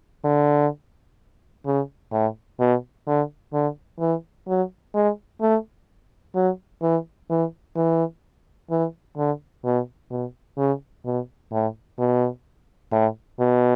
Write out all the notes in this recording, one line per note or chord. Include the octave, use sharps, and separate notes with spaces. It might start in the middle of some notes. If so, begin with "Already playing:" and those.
D3
C#3
A2
B2
D3
D3
E3
F#3
G#3
A3
F#3
E3
E3
E3
E3
D3
B2
B2
C#3
B2
A2
B2
A2
B2